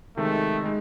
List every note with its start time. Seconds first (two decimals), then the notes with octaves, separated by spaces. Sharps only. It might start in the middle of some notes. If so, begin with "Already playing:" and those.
0.17 C3 D#3 G#3 A3
0.64 G#3 D#4